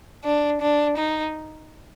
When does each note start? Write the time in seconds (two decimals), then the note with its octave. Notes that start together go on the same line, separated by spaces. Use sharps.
0.24 D4
0.61 D4
0.97 D#4